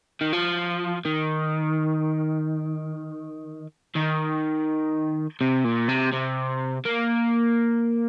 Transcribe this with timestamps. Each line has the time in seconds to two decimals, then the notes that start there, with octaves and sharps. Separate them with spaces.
0.21 D#3
0.33 F3
1.05 D#3
3.95 D#3
5.41 C3
5.65 A#2
5.89 C3
6.13 C3
6.85 A#3